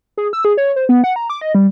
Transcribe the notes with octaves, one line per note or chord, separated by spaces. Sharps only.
G#4
E6
G#4
C#5
C5
B3
F#5
A#5
D6
D#5
G3